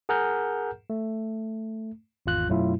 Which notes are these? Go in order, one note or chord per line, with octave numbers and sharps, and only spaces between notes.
G#4 A#4 F#5 A#5 F6 G6
A3
G#1 E2 F4 F#6
F#2 B2 F#3 A3 E4 F4